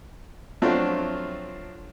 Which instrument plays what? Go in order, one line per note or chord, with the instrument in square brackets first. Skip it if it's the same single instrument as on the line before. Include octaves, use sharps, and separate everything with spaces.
[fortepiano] F3 F#3 A3 C4 D4 F4